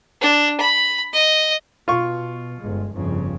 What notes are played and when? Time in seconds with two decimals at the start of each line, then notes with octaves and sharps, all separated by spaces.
0.21 D4
0.60 B5
1.13 D#5
1.88 B2 F4 C#6
2.61 G1 G#3
2.92 G1 F2 C#3